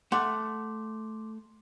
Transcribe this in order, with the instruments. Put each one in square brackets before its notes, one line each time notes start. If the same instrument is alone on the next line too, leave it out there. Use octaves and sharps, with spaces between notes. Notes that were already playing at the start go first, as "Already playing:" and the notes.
[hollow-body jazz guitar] A3 F#5 [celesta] C6 D6